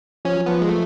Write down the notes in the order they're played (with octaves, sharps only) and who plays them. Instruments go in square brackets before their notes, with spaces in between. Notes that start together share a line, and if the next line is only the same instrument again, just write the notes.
[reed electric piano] F3 [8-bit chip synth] C#4
[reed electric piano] F#3
[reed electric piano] F3 [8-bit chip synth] B3
[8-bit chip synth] G#3
A3